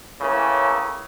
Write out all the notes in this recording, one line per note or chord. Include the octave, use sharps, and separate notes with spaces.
A2 C#3 E3 A#3